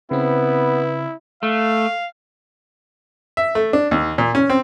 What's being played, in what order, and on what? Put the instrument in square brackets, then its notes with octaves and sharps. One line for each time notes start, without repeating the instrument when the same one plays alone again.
[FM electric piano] C#3 C4 [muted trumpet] B3 [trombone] E4 [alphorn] B4
[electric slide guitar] A3 [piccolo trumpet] F5
[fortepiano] E5
A3
D4
D#2
A#2
C#4
C4